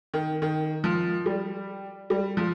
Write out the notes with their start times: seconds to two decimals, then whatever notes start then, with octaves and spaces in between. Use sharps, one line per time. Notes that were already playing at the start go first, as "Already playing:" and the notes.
0.14 D#3
0.42 D#3
0.84 F3
1.26 G3
2.10 G3
2.37 F3